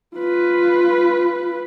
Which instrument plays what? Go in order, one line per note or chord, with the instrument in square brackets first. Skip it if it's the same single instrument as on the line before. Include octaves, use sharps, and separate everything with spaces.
[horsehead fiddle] F4 B4